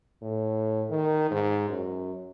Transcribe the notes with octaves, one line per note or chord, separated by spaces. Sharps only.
A2
D#3
G#2
F#2